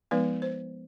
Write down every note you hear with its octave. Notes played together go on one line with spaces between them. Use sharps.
F3 G#3 B3 D#4 B4
C5